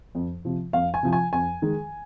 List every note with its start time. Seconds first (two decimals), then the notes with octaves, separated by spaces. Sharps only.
0.15 F2
0.45 C3 F3
0.73 F2 F5
0.94 G#5
1.03 C3 F3
1.13 G#5
1.33 F2 G#5
1.62 D#3 G#3